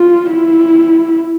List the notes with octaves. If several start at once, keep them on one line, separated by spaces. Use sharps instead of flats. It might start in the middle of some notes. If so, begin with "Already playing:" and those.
Already playing: F4
E4